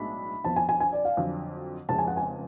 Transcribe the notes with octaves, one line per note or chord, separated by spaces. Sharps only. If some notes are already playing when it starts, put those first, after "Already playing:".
Already playing: B1 A2 G#3 D4 B5
F2 F3 B3 A5
G#5
G#5
G#5
D5
F5
F2 D3 F#3
F1 F2 C#3 G#3 A5
G#5
F#5
G#5